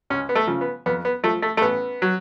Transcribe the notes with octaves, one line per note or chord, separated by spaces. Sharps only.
C#2 C#4
B3
A3
C#3 F3
B3
F2 B3
B3
F3 A3
A3
A3
A1 B3
F#3